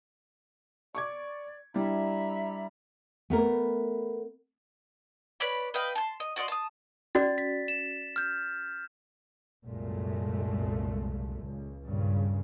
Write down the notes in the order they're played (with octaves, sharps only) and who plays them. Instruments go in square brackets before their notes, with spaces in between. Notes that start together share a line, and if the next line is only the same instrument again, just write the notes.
[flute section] D5 [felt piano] C#6 D6 G#6
[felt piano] G3 D4 E4 [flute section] E5 A#5 B5
[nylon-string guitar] A3 B3 A#4
[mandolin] B4 C#5 D5 B5
B4 D#5 F5 G5
A5 C6
D#5
F#4 D5 D#5 C6
A5 D#6
[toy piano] C#4 F#4 D5 [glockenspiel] A6
[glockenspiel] B6
E7
F6 G6
[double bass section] C2 F#2 A#2 G#3 A3
C#2
G2 A#2 C#3